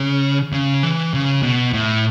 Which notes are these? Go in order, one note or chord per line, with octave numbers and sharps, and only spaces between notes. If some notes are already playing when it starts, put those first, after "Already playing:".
Already playing: C#3
C#3
E3
C#3
B2
A2